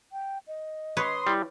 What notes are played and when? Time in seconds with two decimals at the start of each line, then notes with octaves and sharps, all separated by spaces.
0.12 G5
0.48 D#5
0.97 B4 C#5 C6 D#6
1.27 G3 E4